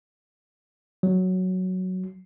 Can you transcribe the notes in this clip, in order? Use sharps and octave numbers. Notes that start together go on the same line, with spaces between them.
F#3